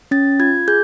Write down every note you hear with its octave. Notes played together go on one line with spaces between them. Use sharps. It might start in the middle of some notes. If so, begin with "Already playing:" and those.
C#4 A6
F4 G#6
G#4 G6